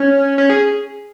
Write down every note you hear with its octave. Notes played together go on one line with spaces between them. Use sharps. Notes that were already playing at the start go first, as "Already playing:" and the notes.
Already playing: C#4
C#4
G#4